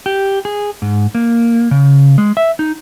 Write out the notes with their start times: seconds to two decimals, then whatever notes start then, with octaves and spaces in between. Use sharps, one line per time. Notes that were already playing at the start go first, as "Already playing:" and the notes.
0.06 G4
0.45 G#4
0.82 G#2
1.15 A#3
1.71 C#3
2.18 G#3
2.37 E5
2.59 D#4